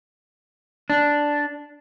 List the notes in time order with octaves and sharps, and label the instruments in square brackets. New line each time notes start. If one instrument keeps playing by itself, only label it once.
[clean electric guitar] D4